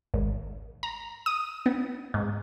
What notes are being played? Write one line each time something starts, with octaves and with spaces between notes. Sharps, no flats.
G#1
A#5
D#6
B3
G#2